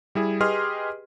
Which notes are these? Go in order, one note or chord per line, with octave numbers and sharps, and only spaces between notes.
G3 E4 G#4
G4 G#4 B4 D#5 C6 F6